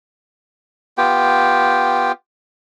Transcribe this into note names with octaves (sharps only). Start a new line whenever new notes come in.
B3 F4 G4 G5